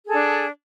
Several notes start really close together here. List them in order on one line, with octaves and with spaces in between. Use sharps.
G#4 A4 D4